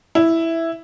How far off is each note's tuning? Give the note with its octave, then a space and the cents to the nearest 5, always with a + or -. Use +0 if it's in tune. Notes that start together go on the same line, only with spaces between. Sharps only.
E4 +0